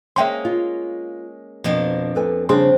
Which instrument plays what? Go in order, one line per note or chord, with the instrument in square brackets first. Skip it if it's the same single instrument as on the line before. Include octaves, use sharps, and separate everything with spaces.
[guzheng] G#3 A#3 C#4 [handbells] E5 G5 C6
[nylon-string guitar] F4
[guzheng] F2 A#3 D4 [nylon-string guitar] B2
[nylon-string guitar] A4 B4 G#5
[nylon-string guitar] C#3 G3 D4 [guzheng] C4 [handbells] G#4 C6